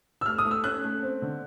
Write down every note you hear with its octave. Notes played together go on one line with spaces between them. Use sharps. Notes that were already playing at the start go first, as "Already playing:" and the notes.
E6
A3 F6
D#6
A3
E6
C#4 F#6
A3
C4
D3